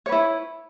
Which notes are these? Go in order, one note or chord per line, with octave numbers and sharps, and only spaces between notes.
E4 B4 C#5